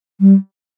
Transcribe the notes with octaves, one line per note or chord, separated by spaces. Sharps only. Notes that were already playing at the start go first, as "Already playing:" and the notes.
G3